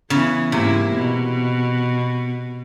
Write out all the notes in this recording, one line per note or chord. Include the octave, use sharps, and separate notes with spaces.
C#3 E3 B3
G#2 C3 A#3 E4
B2